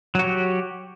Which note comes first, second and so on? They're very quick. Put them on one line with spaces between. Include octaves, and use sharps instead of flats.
F#3 F#4 G4